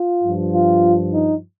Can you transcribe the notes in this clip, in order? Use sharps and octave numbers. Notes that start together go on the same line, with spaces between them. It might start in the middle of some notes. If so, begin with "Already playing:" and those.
Already playing: F4
G2 F3
F4
D#4